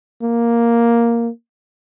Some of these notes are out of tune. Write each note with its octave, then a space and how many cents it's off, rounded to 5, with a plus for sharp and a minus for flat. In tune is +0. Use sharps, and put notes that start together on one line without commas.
A#3 +5